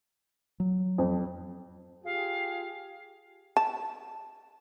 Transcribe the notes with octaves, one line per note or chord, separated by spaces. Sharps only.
F#3
F2
F4 G4 G#4 F5
A5